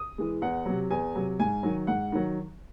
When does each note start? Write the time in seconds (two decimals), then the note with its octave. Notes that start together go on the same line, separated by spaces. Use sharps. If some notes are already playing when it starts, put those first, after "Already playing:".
Already playing: D#6
0.18 E3 G#3
0.42 E2 F#5
0.66 C3 F#3
0.91 E2 G#5
1.15 C3 F#3
1.40 G#2 G#5
1.63 D#3 F#3
1.87 G#2 F#5
2.12 D#3 F#3